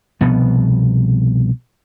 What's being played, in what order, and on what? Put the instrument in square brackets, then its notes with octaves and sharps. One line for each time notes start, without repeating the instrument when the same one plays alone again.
[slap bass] C2 B2 F3 B3